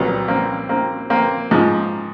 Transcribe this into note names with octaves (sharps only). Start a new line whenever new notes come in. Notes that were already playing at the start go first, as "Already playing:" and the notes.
Already playing: C2 A#2 F#3 B3
A#3 C4
A#3 C4
A#3 C4
G#2 F3